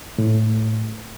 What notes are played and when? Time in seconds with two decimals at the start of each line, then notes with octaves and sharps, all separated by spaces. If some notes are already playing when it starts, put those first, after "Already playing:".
0.18 A2